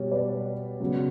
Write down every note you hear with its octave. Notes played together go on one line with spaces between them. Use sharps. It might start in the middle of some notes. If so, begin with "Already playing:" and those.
Already playing: B2 G3 C#5
B4 D5
C#3 F#3 B3